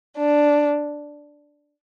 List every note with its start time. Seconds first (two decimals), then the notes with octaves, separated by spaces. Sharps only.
0.18 D4